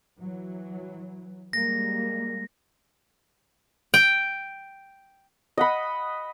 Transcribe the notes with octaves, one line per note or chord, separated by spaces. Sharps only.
E3 F#3
G3 G#3 A#3 A#6
G5
D#5 F#5 B5